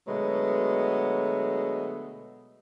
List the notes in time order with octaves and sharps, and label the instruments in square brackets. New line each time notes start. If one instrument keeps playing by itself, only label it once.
[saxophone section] B2 D3 F#3 G#3 A3 B3